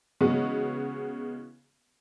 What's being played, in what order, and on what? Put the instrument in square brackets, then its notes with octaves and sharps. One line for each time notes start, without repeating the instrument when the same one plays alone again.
[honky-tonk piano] C#3 E3 G#3 B3 F#4